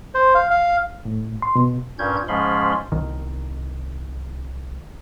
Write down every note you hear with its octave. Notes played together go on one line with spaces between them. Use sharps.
C5
F5
F5
A2
C6
B2
G2 A#2 C#4 G6 G#6
G#2 F3 G#3 C#4 B5 C6
C2 D#3